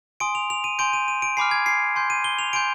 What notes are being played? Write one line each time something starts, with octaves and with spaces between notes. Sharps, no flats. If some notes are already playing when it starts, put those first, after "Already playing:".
G#5 C6 D#6 D7
F7
F7
D#7
G#5 C6 G6 D7
D#7
D#7
D7
G#5 B5 D6 F6 C7
G#6
C7
G#5 C6 G6
D#7
G7
F7
G#5 C6 G6 D7